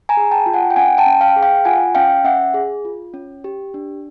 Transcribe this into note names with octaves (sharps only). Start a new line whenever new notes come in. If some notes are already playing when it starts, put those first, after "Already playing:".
G#5 A#5
G#4
G5 A5
F4
F#5 G#5
G5
C#4 F#5 G#5
G5 A5
C#4
F5 G5
G#4
F5 G5
F4 F#5 G#5
C#4 F5 G5
C#4 E5 F#5
G#4
F4
C#4
G4
D4